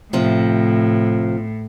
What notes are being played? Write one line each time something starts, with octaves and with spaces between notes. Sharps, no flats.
A2 C3 F3